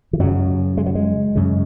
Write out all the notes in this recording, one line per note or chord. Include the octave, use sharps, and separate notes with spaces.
E3
F#2 C#3 F#3
G#3
F#3
G#3
F#2 C#3